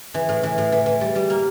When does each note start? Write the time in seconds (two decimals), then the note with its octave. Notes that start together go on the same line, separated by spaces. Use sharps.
0.14 E3
0.29 A2
0.43 E3
0.58 A2
0.72 E3
0.86 E3
1.01 G3
1.15 G3
1.30 A#3